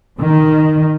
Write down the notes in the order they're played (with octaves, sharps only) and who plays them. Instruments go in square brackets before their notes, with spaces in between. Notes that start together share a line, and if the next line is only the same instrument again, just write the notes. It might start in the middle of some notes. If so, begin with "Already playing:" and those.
[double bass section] D#3